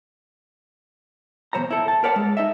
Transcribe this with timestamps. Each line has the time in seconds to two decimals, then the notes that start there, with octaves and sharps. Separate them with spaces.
1.53 E2 B2 D#3 C5 C#5 A#5
1.71 E4 A4
1.88 A5
2.04 A#4 B4 C#5 D5 F#5 A5
2.16 G#3 A4
2.37 D#4 D#5 E5